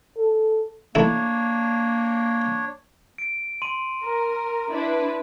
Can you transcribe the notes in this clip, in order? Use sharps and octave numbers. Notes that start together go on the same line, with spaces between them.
A4
A3 A#3 D4 E4 C#5
D7
C6 D#7
A#4
D4 E4 B4